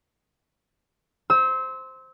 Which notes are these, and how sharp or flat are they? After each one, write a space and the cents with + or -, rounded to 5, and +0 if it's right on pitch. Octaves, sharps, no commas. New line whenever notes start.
C5 +0 E6 -30